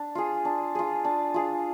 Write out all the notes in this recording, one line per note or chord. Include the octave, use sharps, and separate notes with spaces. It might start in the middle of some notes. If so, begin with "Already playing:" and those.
Already playing: D4
F4 G#4
D4
F4 G#4
D4
F4 G#4